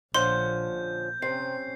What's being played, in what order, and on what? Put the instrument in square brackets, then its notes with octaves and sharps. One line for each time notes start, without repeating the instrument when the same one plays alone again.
[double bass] A#1 A#2 [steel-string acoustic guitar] D3 F3 C#4 [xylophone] C6 [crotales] G6
[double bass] A#2
[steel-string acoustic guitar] C3 [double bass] C4 C#4 [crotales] C7